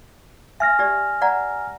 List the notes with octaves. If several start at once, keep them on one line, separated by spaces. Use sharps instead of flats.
E5 G#5 F6 A#6
G4 D5
D5 F#5 A#5